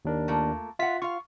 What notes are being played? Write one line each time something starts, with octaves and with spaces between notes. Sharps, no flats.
D#2 D4 A#4
A3 A#3 F4
F4 E5 F#5 B6
F4 F5 C#6